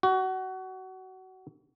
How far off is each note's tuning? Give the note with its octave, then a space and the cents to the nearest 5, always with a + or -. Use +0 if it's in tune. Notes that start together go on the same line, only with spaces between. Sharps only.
F#4 +25